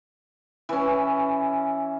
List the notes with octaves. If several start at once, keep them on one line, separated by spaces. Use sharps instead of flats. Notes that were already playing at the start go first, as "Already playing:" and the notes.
E3 C#4